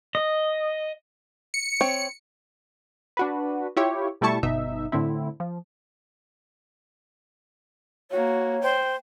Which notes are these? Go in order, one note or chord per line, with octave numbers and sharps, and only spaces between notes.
D#5
C#7
C4 C#5
D4 F#4 B4
E4 F4 G4 C#5
B2 G3 A3 E4 A5 C#6
G1 B2 D#4 E5
A2 D3 C4 E4
F3
A#3 F#4 C#5
C5 G5